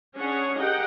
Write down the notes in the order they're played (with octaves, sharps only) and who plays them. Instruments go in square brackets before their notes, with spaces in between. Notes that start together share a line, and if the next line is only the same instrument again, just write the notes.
[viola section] C#4 D4 G#4 C#5 F#5
G4 G#4 A#4 D#5 F#5 G5